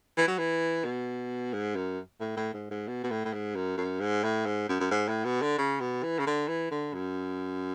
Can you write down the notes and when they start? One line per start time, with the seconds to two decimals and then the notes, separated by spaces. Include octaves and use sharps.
0.17 E3
0.27 F#3
0.38 E3
0.84 B2
1.53 G#2
1.75 F#2
2.20 A2
2.37 A2
2.53 G#2
2.70 G#2
2.87 B2
3.03 B2
3.10 A2
3.25 A2
3.33 G#2
3.55 F#2
3.77 F#2
4.00 G#2
4.23 A2
4.46 G#2
4.69 F#2
4.80 F#2
4.91 G#2
5.08 A2
5.24 B2
5.42 D3
5.58 C#3
5.80 B2
6.03 E3
6.19 C#3
6.26 D3
6.48 E3
6.71 D3
6.94 F#2